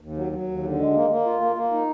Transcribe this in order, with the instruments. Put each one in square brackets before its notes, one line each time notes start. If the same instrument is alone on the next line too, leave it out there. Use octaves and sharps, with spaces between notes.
[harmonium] D#2
F#3
F#3
D#2
D3
G#3
A#3
A#3
F4
A#3
A#3
D#4